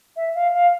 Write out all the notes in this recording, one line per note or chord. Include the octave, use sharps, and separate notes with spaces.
E5
F5
F5